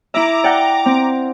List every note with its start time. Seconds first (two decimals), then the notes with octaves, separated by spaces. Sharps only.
0.14 E4 E5 A#5 D6
0.44 D5 F#5 G5
0.86 C4